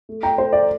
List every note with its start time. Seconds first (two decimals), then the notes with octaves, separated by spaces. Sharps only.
0.09 A3
0.23 G5 A#5
0.37 A3 C5
0.53 D5